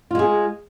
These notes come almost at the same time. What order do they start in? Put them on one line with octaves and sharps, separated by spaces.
F4 G#3 G#4